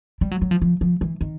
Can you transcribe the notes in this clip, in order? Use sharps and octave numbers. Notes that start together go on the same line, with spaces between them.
G3
F#3
F#3
F3
F3
F3
E3
D#3